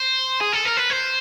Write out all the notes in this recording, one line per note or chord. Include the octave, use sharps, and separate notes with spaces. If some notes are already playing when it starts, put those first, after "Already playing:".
Already playing: C5
G#4
A4
A#4
B4
C5